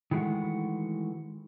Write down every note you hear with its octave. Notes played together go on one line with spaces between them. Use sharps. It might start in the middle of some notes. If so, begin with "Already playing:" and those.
D#3 E3 G#3 A3 F#4